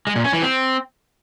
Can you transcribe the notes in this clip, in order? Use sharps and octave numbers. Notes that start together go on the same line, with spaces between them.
G#3
A#2
C#4
E3
C4